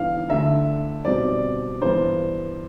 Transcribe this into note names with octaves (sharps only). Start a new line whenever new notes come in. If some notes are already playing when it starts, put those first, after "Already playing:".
Already playing: G2 E3 B3 D4 F5
D2 D3 A3 E5
B2 G3 C4 D5
G2 E3 B3 D4 C5